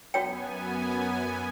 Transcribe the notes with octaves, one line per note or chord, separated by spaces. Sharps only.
F#2 B3 F#4 C#5 G5 G#5